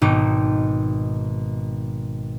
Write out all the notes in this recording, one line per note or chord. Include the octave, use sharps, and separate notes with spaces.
G#1 B2 D#4 D6